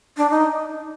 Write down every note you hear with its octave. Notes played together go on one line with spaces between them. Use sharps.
D4
D#4